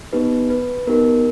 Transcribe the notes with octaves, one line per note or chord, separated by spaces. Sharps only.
B3 D#4 G4 B4
B4
B3 D#4 G4 A#4